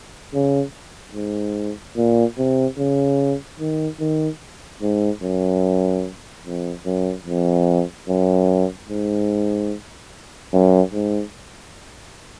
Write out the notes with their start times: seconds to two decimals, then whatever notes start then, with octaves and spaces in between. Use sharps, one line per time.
0.34 C#3
1.15 G#2
1.97 A#2
2.38 C3
2.78 C#3
3.60 D#3
4.00 D#3
4.82 G#2
5.23 F#2
6.45 F2
6.86 F#2
7.26 F2
8.09 F#2
8.89 G#2
10.53 F#2
10.93 G#2